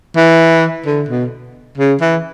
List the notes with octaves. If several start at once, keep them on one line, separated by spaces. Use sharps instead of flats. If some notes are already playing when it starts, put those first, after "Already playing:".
E3
D3
B2
C#3
E3